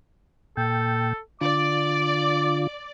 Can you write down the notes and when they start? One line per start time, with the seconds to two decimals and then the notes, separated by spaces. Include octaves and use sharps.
0.57 A#2 A4 G5
1.41 D3 F4 D5 D6